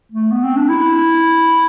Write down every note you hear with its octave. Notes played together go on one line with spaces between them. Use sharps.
A3
B3
C4
D4
E4